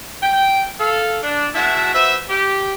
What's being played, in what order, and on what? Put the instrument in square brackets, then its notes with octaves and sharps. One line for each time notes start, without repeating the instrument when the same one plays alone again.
[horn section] G5
A4 F5
D4
B2 G#3 E4 F#4 E5 A5
F#4 B4 C5 E5
G4